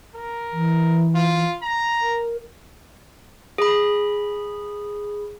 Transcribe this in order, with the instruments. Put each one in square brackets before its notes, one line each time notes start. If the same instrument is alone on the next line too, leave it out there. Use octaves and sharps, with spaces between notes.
[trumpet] A#4
[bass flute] E3
[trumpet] F4
A#5
[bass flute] A#4
[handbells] G#4 B5